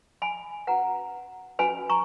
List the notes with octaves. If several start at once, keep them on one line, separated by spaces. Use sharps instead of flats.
G#5 B5
C#4 F#4 B4 F#5 A#5
C#4 F#4 B4 G#5 B5
A#5 C#6